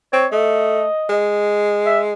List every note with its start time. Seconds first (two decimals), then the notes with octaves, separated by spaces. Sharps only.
0.13 C4 C#5
0.32 A3 D#5
1.09 G#3
1.86 E5